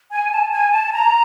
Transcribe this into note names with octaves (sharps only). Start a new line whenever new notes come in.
G#5
A5
G#5
A5
A#5